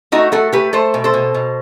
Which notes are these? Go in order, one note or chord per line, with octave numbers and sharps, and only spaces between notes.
A3 D#4 F#4
A3 F#4 A4
A3 G4 B4
A3 A4 C5
B2
A4 C5
B2
B2